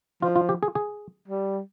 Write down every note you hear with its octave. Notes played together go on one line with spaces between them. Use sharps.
F3 F4
F4
G4
G#4
G#4
G3